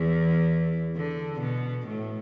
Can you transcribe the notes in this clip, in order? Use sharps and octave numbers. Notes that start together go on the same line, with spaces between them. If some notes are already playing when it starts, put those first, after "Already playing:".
Already playing: E2 E3
D3
B2
A2